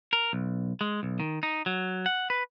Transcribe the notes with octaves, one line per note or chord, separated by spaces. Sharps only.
A#4
B1
G#3
B1
D#3
D#4
F#3
F#5
B4